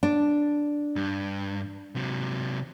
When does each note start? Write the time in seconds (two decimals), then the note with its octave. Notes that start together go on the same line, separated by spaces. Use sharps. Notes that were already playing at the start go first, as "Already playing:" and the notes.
0.03 D4
0.96 G2
1.95 C3 F#3